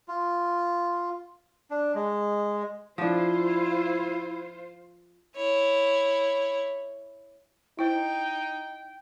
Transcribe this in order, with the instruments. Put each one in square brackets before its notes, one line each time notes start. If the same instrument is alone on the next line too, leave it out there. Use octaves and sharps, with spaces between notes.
[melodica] F4
D4
G#3
[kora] F3 D4 [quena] E4 [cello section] F4 C5
[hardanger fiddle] E4 C#5
[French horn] D#4 [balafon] E4 C5 [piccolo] G5